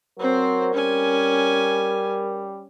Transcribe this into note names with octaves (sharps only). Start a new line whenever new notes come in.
F#3 C4 A#4 C5
G3 C#4 G#5